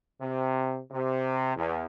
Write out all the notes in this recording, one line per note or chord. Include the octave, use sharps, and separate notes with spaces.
C3
C3
E2